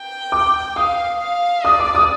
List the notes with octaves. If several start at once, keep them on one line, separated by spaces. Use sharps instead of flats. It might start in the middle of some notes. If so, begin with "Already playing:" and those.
Already playing: G5
D6
F5 D#6
F5
D5 D#6
D6
D#6